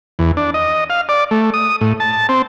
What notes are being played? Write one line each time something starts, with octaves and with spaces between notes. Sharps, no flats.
E2
D4
D#5
F5
D5
A3
D#6
A2
A5
C4